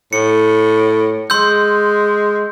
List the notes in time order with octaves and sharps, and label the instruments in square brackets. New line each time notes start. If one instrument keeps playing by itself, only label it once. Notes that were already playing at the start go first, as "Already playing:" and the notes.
[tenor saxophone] A2 [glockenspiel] C#7
[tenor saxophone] G#3 [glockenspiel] C6 E6 G6